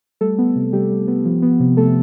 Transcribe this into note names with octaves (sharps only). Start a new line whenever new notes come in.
G3 A3 A4
B3
C3
C3 G3 G4
G3
B3
F3
B3
C3
C3 A3 A4